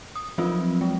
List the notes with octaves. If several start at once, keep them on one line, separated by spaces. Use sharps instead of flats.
D#6
F3 F#3 C4 F4
G#3